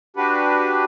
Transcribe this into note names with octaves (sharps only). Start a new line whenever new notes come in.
D4 F#4 G4 B4